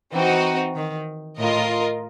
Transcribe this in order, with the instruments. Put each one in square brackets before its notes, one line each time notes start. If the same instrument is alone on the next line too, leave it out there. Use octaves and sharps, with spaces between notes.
[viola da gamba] E3 [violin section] C4 D#4 F#4
[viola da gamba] D#3
[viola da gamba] A2 [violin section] F4 A#4 D#5